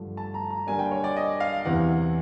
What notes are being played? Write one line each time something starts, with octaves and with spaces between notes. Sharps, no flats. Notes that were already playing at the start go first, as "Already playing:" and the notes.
Already playing: G2 D3 F3 A3
A5
A#5
A#5
D3 G3 A#3 D4 G#5
G5
C#5
D5
D#5
F5
E2 C3 E3 F#5